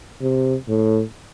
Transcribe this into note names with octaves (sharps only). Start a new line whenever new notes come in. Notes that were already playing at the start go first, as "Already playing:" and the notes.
C3
A2